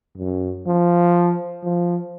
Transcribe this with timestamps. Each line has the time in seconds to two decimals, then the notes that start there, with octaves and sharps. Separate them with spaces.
0.18 F#2
0.66 F3
1.63 F3